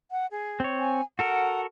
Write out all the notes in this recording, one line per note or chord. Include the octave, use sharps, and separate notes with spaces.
F#5
G#4
C4 C#5
G#5
F#4 A4 A#4 F#5